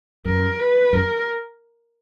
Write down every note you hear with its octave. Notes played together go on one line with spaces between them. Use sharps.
F#2 A#4
B4
F#2 A#4